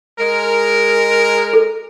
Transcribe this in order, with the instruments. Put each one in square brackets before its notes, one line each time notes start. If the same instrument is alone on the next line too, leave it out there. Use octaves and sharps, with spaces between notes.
[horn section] G#3 A#4
[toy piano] A4